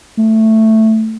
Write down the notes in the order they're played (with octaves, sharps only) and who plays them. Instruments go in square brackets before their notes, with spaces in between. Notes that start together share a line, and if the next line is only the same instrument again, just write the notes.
[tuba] A3